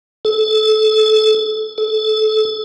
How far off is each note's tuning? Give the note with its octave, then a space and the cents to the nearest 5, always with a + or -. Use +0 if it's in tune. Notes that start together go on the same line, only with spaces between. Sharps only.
A4 -25
A4 -25